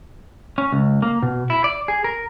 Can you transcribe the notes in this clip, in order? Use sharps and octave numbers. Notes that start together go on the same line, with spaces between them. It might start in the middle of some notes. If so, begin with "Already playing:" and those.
C#4
C#2
A#3
B2
E4
D5
G#4
A#4